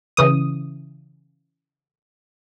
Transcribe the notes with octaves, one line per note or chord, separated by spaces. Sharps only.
C#3 E3 D#6